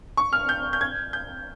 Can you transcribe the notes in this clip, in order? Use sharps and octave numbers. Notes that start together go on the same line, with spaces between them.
C#6
F6
G6
G6
G#6
G6